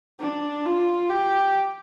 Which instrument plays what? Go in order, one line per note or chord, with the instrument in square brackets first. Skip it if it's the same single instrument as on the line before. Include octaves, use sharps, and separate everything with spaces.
[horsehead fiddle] D4
F4
G4